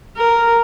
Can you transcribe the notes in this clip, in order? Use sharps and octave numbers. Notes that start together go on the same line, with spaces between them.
A#4